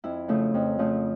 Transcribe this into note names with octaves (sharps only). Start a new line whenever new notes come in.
F2 E4
C#3 F3 A3
F2
C#3 F3 A3